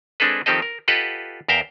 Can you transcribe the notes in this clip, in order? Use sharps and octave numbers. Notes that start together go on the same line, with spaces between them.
G#3 C4 D4 G#4 A4 B4
D#3 F3 C4 G4 A4 D#5
A#4
F4 G4 A4 B4 D#5 F#5
E2 A#4 E5 F5 G5 A#5